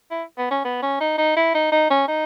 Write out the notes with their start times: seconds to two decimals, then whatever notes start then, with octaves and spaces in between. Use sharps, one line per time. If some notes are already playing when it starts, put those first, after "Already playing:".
0.11 E4
0.38 B3
0.51 C#4
0.64 B3
0.82 C#4
1.00 D#4
1.18 D#4
1.36 E4
1.54 D#4
1.72 D#4
1.90 C#4
2.08 D#4